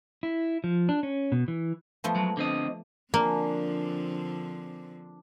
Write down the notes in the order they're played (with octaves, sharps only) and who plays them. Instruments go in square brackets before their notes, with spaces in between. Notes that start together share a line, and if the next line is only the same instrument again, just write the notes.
[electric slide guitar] E4
F3
D4
C#4
B2
E3
[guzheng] F3 A3 B3
[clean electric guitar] F#3 G#3
D3 C4 D#5
[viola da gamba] D3 F3 C4 [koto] A#3 [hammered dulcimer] D4 G#5